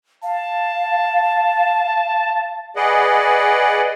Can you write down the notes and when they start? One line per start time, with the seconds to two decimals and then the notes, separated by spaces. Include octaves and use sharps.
0.23 F5 A5
2.76 G#4 B4 D5 D#5 F#5